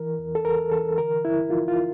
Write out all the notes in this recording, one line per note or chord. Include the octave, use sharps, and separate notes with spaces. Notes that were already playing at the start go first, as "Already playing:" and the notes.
Already playing: E3 A#4
E2
A4
E2 A#4
E3 A4
D3 A#4
G2 E4
F3 F4
F4